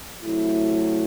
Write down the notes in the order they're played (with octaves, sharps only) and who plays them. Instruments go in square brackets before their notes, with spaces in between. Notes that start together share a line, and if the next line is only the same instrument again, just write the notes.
[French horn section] C3 F#3 A3 E4